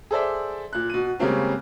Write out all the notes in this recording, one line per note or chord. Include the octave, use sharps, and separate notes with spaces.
G#4 A4 C5 D5 E5
A#2 F#6
B2 D#7
C#3 G3 G#3 A#3 C4 C#4